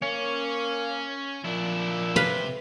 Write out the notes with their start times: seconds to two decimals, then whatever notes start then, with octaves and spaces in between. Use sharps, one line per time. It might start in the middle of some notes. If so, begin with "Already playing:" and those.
0.02 A#3 C#4 C#5
1.44 A#2 F3 D4 E4
2.16 C3 B4 F5 B5